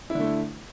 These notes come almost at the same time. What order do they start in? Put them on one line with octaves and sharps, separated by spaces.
E4 D3 A3